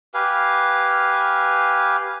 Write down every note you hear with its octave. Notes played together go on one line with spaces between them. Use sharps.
G4 B4 F5 G#5